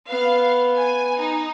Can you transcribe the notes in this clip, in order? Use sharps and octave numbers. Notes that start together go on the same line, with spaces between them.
B3 F5
G#5
D#4